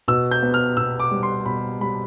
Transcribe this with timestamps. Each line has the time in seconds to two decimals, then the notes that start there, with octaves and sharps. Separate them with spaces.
0.08 B2 E6
0.31 G6
0.42 B3
0.54 F6
0.77 B2 E6
0.99 D6
1.11 G3
1.23 C6
1.46 B2 B5
1.80 G3 B5